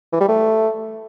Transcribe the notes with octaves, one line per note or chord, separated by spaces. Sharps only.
E3
G3
A3